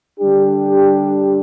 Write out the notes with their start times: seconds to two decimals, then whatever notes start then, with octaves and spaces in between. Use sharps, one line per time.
0.20 D3 G3 D4 G4